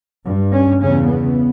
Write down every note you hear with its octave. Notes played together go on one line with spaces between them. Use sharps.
G2
C#4
E2 C#3 C#4
B3